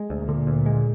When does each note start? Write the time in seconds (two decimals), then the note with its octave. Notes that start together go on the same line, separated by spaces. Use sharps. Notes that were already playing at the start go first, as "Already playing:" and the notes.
Already playing: G#3
0.10 D2
0.19 A#2
0.29 D3
0.47 D2
0.66 G#3